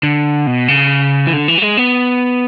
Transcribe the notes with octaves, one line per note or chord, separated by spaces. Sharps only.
D3
B2
C#3
E3
D3
E3
F#3
G#3
B3